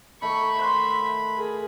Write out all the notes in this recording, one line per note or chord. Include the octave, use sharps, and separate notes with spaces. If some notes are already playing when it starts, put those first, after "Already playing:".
D#3 A3 B5 C#6
C5 E5 F#5 C6
G#4 A#4